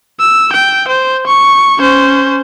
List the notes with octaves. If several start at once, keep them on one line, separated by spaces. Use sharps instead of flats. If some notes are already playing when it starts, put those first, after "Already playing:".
E6
G5
C5
C#6
C#4 C5